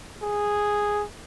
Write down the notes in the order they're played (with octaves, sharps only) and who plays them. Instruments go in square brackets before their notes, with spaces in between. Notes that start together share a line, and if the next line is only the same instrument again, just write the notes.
[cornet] G#4